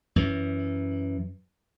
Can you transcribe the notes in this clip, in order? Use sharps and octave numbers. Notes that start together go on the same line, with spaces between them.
F#2 E3